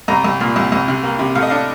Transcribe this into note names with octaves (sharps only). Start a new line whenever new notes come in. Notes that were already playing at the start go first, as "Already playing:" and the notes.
C2 A#5
C2
A#2
C2
C2
C3
A#3
C3
A2 F5
D#5
D4 F5